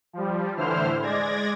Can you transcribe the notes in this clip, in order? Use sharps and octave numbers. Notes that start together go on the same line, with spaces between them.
F3 G3
A2 D3 E3 E4 C5 F6
G#3 D5 G#6 A#6